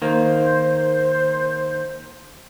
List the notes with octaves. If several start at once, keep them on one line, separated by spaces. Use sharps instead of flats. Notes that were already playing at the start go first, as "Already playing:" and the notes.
D#3 A#3 C5